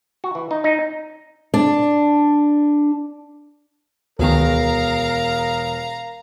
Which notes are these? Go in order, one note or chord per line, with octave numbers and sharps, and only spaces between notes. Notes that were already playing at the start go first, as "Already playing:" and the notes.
F#4
E3
D#4
D#4
D4
E1 D2 D#3 B3 G#4 A#4 F5 A#5